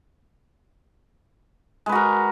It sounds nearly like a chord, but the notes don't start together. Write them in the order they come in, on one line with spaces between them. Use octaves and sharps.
G#3 B4 F#4 A#4